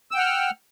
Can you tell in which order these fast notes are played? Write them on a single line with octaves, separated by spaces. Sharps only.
E6 G5 F#5 F6